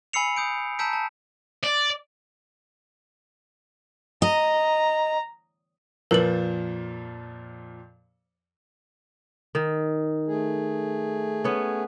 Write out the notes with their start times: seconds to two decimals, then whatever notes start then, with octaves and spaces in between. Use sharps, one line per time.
0.13 G#5 B5 E6 C7 C#7 F7
0.37 D#6 G6 D7
0.79 A5 A#5 E6 G6 B6 D7
0.93 A5
1.64 D5
4.22 D#5 A#5
6.11 F2 A#2 F3 A#4 B4 F#7
9.55 D#3
10.28 A3 G#4
11.44 B3 C#4